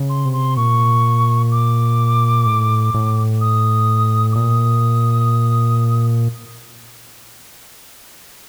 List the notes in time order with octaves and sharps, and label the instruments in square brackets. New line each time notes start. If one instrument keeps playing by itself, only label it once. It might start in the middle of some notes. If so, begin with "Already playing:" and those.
Already playing: [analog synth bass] C#3
[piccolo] C6
[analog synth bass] C3
[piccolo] C6
[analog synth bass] A#2 [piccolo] C#6
[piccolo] D6
[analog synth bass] A2
A2
[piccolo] D#6
D6
[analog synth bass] A#2 [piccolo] D#6